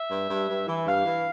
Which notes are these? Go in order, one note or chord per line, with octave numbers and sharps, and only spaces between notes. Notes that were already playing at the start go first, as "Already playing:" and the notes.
Already playing: E5
G2
G2
G2
E3
G2 F5
E3